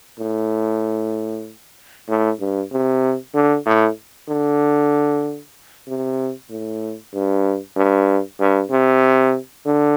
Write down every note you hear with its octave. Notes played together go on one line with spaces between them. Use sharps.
A2
A2
G2
C3
D3
A2
D3
C3
A2
G2
G2
G2
C3
D3